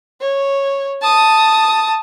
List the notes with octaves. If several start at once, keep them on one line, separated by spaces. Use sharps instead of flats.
C#5
A5 D#6